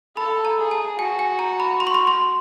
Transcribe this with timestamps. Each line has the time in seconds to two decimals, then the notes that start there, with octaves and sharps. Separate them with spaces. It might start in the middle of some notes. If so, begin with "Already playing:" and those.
0.17 A4 B5
0.45 A#5
0.58 G#4
0.71 A5
0.99 F#4 G#5
1.19 G#5
1.39 A#5
1.60 B5
1.80 C6
1.87 C#6
1.94 C6
2.07 C6